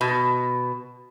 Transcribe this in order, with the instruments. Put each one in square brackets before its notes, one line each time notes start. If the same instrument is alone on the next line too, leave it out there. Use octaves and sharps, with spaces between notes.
[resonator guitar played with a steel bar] B2